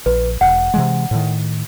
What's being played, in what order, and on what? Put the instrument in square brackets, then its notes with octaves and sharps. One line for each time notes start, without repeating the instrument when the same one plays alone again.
[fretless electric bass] A#1 [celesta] B4
[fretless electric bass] E1 [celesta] F#5
[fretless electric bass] C3 E3 G#3
A2 D#3